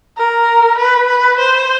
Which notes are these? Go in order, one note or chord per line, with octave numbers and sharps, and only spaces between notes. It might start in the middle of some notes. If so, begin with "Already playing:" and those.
A#4
B4
B4
C5